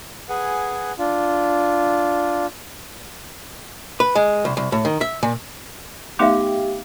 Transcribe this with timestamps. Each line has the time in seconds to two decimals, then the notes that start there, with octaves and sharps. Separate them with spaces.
0.29 G#4 B4 F#5 G#5
0.99 D4 F4
4.00 B4
4.15 G#3
4.45 C2
4.57 C2
4.72 A2
4.85 D#3
5.01 E5
5.23 A#2
6.19 A3 B3 D#4 G4 E5 F5 D6